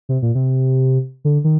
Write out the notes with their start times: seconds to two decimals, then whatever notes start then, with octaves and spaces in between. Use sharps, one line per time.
0.09 C3
0.22 A#2
0.35 C3
1.25 D3
1.44 D#3